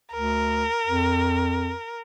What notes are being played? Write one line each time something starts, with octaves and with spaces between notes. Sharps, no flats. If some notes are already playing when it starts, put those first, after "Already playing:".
D2 A#4
F2